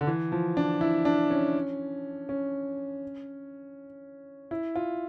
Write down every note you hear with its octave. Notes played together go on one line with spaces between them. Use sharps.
D3
E3
F3
D4
E4
D4
C#4
C#4
E4
F4